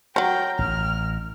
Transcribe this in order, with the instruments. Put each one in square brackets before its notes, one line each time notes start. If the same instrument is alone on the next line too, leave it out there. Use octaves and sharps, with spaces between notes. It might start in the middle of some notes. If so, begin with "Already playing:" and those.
[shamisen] F#3 C#5 [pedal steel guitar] A#4 [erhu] G5
[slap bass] A1 [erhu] F6